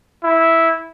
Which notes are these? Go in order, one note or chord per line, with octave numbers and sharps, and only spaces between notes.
E4